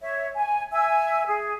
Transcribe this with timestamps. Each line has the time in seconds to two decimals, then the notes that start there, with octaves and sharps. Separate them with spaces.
0.01 C#5 E5
0.35 G#5
0.72 E5 G#5 E6
1.26 G#4